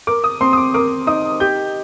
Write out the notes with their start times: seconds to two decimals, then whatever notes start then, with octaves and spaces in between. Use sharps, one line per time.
0.07 A#4 D6
0.24 D#6
0.41 C4 C6
0.53 D#6
0.57 D6
0.74 A#4 D6
1.07 D#4 D#6
1.40 G4 G6